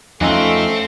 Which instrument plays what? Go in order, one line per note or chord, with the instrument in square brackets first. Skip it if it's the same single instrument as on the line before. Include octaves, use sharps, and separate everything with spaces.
[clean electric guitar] F2 D#4 F4 [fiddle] A3 [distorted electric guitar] C4 [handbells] C#4 G#5 E6